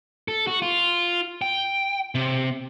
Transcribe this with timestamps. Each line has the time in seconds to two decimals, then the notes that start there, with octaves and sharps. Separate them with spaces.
0.28 A4
0.47 F#4
0.62 F4
1.42 G5
2.15 C3